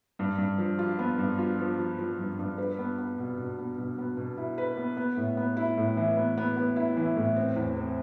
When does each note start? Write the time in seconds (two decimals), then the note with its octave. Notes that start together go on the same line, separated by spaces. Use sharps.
0.19 G2
0.38 G2
0.58 F3
0.79 F4
0.99 B3
1.19 G2
1.39 F4
1.59 F3
1.79 F4
1.99 F3
2.18 G2
2.39 G2
2.58 B4
2.79 B3
2.98 B3
3.18 B2
3.38 B2
3.58 B3
3.78 B2
3.98 B3
4.17 B2
4.38 E4
4.58 B4
4.77 B3
4.97 B3
5.17 A2
5.37 B3
5.57 E4
5.77 A2
5.97 E3
6.17 B3
6.37 B3
6.57 B3
6.76 E4
6.97 E3
7.16 A2
7.36 C4
7.56 E2
7.76 C4